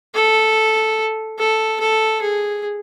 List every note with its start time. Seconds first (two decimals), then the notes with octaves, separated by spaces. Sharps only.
0.14 A4
1.38 A4
1.80 A4
2.21 G#4